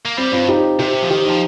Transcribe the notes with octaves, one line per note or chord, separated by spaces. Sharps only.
A#3
G3 C4
G2 C4 F4
D#4 G4
C3 G4 C5
F3
D#3 G4 C5
F3 D#4